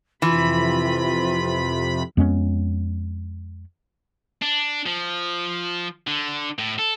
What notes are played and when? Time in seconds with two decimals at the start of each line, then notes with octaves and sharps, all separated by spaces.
0.22 F2 C3 E3 F4 B5
2.17 F2 G#3 B3 C#4
4.42 D4
4.87 F3
6.07 D3
6.59 A2
6.79 A4